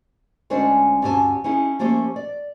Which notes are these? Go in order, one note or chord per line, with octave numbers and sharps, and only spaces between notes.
D2 G#3 C#4 D4 C5 C#5
D2 G2 C#4 G4 G#5 A5
C#4 D#4 E4 G#4
F3 A3 A#3 C#4 G4
D5